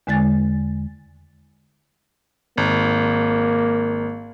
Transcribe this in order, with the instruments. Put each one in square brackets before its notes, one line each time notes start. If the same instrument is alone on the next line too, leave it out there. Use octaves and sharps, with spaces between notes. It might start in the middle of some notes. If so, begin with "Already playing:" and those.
[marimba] E2 D3 G#3 G#5 A6
[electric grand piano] G#1 [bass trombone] A#3